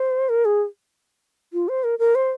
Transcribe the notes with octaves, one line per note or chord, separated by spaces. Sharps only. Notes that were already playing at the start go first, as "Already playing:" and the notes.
Already playing: C5
A#4
G#4
F4
C5
A#4
A#4
C5